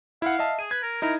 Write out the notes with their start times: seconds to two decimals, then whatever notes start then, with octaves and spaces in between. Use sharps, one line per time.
0.22 E4 F5 F#5
0.39 D#5 E5 A5
0.59 G#4 D#7
0.71 B4 G#6
0.82 A#4
1.02 D#4 E4 A#4